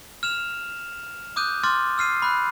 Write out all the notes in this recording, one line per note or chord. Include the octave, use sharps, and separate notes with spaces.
F6 E7 F7
D6 D#6 F#6 G6 D#7
C6 D6 F6 A6
E6 F6 C7 D#7
B5 F#6